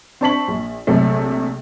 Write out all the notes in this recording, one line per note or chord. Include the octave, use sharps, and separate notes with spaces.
C4 D4 A5 C#6 B6 F#7
A#1
A#1 C3 F#3 A3